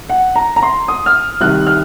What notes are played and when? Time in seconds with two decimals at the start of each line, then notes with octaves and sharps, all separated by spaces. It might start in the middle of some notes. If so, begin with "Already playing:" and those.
0.09 F#5
0.36 A#5
0.56 A#5
0.63 C6
0.88 D#6
1.06 F6
1.41 C2 C3 D#3 F#6
1.67 F6